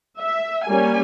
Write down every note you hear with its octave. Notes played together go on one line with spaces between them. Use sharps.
E5
G3 A#3 C#4 G#5